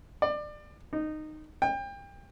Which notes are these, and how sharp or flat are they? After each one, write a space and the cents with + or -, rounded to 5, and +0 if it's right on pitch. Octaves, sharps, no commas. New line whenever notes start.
D5 +25
D#4 -15
G5 +30